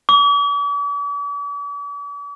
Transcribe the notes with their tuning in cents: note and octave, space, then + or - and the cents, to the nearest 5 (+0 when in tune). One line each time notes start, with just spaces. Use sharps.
D6 -45